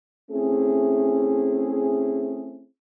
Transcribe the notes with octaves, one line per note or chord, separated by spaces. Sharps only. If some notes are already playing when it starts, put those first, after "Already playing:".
A3 C4 C#4 E4 G#4